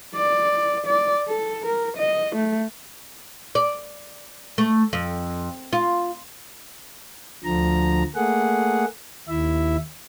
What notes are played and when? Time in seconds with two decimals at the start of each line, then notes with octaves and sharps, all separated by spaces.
0.15 D5
0.86 D5
1.28 A4
1.66 A#4
1.97 D#5
2.36 A3
3.55 D5
4.58 A3
4.93 F2
5.73 F4
7.44 D2 D3 F3 A#5
8.16 A3 A#3 G#4 F#5
9.28 D#2 E4 E5